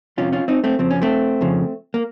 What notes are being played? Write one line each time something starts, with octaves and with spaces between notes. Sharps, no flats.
F2 C3 F3 C#4 F4
C#4 F4
C4 D#4
A3 C4
F2 C#3 F3 C4
C#4
A3 C4
F2 C#3 F3
A#3